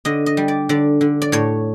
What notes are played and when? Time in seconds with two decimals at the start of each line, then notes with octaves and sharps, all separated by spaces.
0.05 D3 D#5
0.26 D#5
0.37 G3
0.48 D5
0.69 D3 D5
1.01 D3
1.22 D5
1.32 A2 C#5